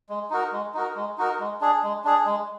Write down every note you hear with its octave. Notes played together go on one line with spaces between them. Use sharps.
G#3
D#4 F#4 A#4
G#3
D#4 F#4 A#4
G#3
D#4 F#4 A#4
G#3
D4 G#4
G#3
D4 G#4
G#3